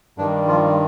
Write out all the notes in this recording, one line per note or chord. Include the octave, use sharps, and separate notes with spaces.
G2 D#3 G3 D4
F3 F4